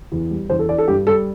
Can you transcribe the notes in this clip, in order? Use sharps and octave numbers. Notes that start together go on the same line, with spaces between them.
E2
G3
E2 C5
A4
E3 D5
A4
G2 G4
G3 A4